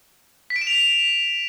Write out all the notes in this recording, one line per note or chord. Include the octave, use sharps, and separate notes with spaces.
B6
D7
E7
F7
B6